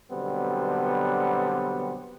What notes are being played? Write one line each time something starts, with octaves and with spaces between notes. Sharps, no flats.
B2 D3 F#3 G3 B3 C4